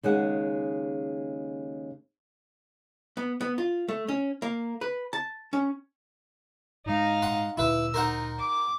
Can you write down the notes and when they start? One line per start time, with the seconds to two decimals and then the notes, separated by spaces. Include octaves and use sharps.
0.03 D#2 C#3 G#3 F#5
3.17 B3
3.41 B3
3.58 F4
3.88 A3
4.08 C#4
4.42 A#3
4.81 B4
5.13 A5
5.53 C#4
6.86 G#2 G#3 D#4 F5
7.22 F#5 C6
7.57 D2 A#2 D3 E4 B4 E6
7.94 D#4 A#4 C5 F#5
8.38 D6